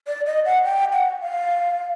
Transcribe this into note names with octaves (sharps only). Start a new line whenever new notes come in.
D5
D#5
F#5
G5
F#5
F5